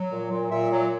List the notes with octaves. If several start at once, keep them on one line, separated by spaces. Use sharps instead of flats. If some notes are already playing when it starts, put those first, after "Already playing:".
Already playing: F#3
A#2
A#2
A#2 E5
F#3